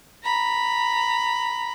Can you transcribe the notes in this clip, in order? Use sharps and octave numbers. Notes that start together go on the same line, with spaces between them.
A#5 B5